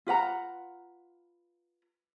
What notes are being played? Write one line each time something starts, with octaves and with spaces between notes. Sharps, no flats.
F4 B4 F#5 A#5